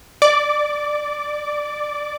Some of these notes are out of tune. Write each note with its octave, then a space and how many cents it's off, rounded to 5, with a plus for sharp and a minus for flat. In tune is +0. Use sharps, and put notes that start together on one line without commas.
D5 +10 D6 -15